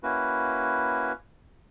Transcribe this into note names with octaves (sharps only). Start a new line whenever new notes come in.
A#3 C#4 E4 F#4 B4